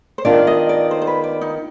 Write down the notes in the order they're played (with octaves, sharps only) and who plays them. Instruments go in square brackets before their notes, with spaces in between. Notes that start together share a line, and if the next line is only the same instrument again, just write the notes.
[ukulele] C5
[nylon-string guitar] D#3 B3 D4 F4 [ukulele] D5
[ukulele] D#5
D5
C5
C5
B4
D5
D#4